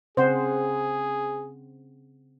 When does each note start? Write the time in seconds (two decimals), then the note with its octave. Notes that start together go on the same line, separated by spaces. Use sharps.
0.17 C#3 C4 G#4 C5 F#5